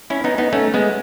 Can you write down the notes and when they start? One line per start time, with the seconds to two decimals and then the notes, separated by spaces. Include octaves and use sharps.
0.10 C#4 E4
0.24 B3 D#4
0.38 B3 D#4
0.53 A3 C#4
0.74 G#3 B3